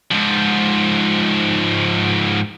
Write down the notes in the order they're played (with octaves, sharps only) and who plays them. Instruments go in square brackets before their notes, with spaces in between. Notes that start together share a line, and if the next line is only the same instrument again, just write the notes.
[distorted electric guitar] G#2 F3